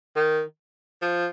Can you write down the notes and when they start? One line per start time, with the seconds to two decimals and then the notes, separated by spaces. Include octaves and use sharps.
0.16 D#3
1.02 F3